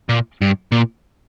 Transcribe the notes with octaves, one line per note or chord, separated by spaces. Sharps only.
A#2
G2
A#2